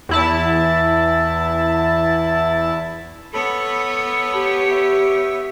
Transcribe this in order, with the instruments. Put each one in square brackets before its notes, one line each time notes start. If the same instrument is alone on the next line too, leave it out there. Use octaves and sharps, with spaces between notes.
[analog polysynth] E2 E4 A5
[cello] B3 C#5 [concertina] A4 B5
[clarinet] G4
[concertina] E5